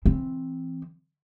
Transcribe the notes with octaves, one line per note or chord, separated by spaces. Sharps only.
E3 C4